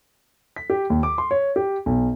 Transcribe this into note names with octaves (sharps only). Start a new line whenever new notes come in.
B6
G4
D#2
D6
C6
C#5
G4
B1